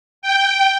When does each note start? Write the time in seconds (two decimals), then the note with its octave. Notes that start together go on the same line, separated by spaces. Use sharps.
0.22 G5